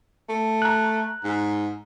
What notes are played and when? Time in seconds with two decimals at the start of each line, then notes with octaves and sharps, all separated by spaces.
0.29 A3
0.62 A#5 F#6
1.24 G#2